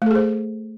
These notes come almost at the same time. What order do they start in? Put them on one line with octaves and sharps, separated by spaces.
A3 A4 G#4 C5